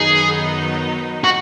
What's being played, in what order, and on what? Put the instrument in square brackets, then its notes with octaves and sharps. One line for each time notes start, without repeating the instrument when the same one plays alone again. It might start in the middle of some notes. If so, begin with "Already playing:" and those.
Already playing: [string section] F#2 D#3 F#3 B3 D#4 [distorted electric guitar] G#4
[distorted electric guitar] F#4